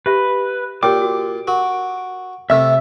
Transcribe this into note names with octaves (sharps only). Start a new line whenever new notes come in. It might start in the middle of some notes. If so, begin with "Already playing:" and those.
G4 B4 E5
A#2 G4 C#5 G5 D6
F#4
F#4 A#4
C3 A3 E5 E6